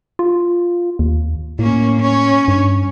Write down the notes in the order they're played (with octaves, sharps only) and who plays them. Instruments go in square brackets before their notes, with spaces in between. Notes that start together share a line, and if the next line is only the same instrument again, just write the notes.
[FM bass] F4
D#2
[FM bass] A2 [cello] A#3 C#4
[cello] C#4 C#5
[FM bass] G2